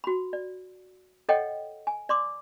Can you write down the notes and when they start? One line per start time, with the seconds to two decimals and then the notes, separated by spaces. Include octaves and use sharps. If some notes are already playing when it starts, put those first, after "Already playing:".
0.04 F#4 B5
0.33 D5
1.29 A4 C#5 D#5 F#5 G5
1.87 G#5
2.09 D5 C6 D6